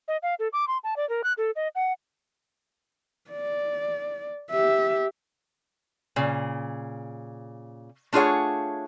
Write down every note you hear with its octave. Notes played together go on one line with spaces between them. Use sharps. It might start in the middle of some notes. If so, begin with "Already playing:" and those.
D#5
F5
A4
D6
C6
A5
D5
A#4
F#6
A4
D#5
F#5
D5
G4 E5
A#2 C#3
A3 D4 F4 G#4 C#5 F#5